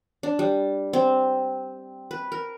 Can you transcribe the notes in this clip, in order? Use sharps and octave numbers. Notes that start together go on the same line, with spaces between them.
D4
G3
C4
B4
A#4